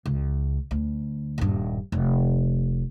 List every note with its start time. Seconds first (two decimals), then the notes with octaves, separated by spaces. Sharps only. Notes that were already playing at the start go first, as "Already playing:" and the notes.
0.06 C#2
0.71 D2
1.38 D#1 G2
1.92 F1